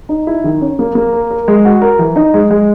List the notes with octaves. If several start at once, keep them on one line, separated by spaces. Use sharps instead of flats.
D#4
E4
D#3
C#4
A#3
A#3
A#4
A#4
G#3
F#4
A#4
E3
D#4
G#3
G#3